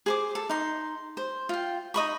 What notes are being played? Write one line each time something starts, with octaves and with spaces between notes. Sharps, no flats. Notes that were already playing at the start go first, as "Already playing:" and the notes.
G#4 C5 D6
A4
D#4 C6
C5
F4 G5
D#4 D#5 B5 C#6